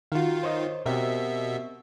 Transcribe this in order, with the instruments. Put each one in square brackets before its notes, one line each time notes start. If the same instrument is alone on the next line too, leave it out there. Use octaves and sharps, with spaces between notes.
[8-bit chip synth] D#3 F4 [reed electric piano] F#4 F5
[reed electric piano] C5 C#5 D#5
[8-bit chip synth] B2 E5 [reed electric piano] C4 G4 A#4